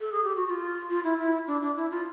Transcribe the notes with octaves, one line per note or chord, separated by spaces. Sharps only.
A4
G#4
G4
F#4
F#4
F4
F4
E4
E4
D4
D4
E4
F4